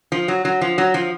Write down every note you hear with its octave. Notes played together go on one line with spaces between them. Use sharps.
F3
F#3
F#3
F3
F#3
F3